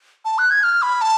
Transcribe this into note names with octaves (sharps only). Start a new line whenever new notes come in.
A5
F#6
G#6
F6
B5
A5